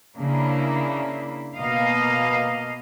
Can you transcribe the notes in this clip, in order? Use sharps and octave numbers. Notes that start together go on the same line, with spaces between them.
C#3 A#3 D4 E4
B2 A#3 D#5 F5